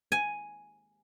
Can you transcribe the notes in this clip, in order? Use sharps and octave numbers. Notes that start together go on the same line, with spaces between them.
G#5